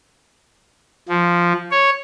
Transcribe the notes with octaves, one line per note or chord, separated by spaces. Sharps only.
F3
C#5